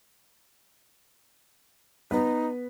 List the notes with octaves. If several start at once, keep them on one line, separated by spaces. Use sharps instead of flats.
B3 D#4 B4